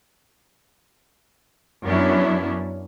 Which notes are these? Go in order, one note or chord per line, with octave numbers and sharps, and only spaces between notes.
F#2 F#3 B3 C#4 D4 E4